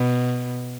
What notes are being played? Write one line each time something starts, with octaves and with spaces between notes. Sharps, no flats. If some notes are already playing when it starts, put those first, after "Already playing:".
Already playing: B2